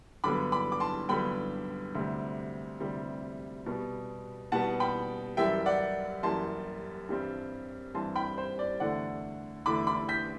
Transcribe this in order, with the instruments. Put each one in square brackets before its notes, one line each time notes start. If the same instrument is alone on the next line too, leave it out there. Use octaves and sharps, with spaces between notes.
[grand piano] G2 D3 F#3 B3 B5 D6
B5 D6
D6
A5 C6
G2 D3 F#3 B3 G5 B5
D2 C3 G3 C4
D2 C3 G3 C4
B2 G3 B3
B2 G3 B3 F#5 A5
G5 B5
F#2 E3 G3 E5 G5
D5 F#5
F#2 E3 G3 A5 C6
G2 E3 G3 C4
G2 E3 G3 C4 A5 C6
G5 B5
C5
D5
E2 D3 A3 D5 F#5
E2 D3 A3 B5 D6
B5 D6
G6 B6